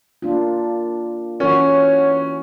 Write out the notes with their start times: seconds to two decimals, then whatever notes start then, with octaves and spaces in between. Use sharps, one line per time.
0.22 A#3 D4 F4
1.40 E3 C#4 F#4 C#5